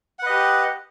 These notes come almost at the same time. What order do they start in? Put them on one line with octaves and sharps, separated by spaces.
F#5 B4 D#5 G4